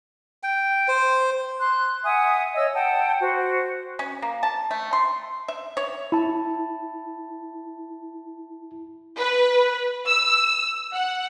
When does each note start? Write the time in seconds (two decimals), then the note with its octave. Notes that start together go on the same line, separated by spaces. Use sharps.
0.43 G5
0.88 C5
1.60 C6 F#6
2.04 E5 F#5 G#5 D#6
2.55 C#5 D#5 E6
2.74 F#5 G5 A5
3.21 F#4 C5
3.99 C#4
4.22 A#3
4.43 A5
4.71 A3
4.93 C6
5.48 E5
5.77 C#5
6.12 E4 A5
9.19 B4
10.06 E6
10.93 F#5